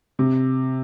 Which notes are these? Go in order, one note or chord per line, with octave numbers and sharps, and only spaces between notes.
C3